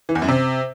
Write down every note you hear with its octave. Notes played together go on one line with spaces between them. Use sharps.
E3
E2
F#2
C3